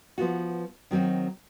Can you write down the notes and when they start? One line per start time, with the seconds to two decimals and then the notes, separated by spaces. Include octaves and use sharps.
0.18 F3 B3 F4 F#4
0.91 D#3 F#3 C4 D#4 F#4